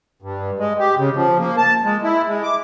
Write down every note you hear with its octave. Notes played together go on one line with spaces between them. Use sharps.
G2
G#3
G4
C#3
F3
A#3
A5
G#3
E4
G#3
D6